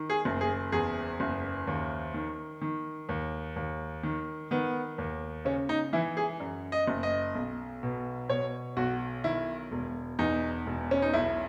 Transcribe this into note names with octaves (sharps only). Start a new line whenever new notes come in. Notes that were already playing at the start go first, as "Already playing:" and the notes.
Already playing: D#3
G#4
F#1
G#4
E2 G#4
F#1
D#2
D#3
D#3
D#2
D#2
D#3
D#3 B3
D#2
C#3 C#4
D#4
E3 E4
G#4
F#2
D#5
F#1
D#5
B1
B2
B2 C#5
B1 F#4
D#3 E4
E1
E2 D#4
E1
C#4
D#4
B1 E4